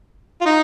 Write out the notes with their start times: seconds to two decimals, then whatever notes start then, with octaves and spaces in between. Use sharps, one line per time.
0.41 F4
0.46 D#4